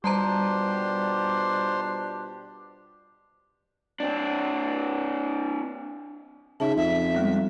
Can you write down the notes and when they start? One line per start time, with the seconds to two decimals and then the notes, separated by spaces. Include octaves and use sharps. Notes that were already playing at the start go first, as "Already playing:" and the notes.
0.04 B2 G3 D4 F4 G4 C5 A5 A#5
4.00 C4 D4
6.60 C#3 D#4 E5 A5
6.76 F2 E5
7.15 G3 G#3 B3